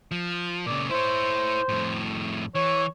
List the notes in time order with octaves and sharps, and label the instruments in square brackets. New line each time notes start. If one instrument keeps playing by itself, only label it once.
[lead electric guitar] F3
[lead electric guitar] A#2 C#3 [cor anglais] D5
[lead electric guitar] E4 C#5 [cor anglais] C5
[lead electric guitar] F2 A2
[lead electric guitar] E3 [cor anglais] C#5